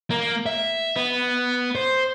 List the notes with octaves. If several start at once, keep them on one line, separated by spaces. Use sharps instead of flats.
A#3
E5
B3
C5